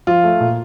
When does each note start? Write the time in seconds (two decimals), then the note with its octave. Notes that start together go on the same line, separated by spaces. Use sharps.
0.07 F3 F4
0.24 A3
0.40 A#2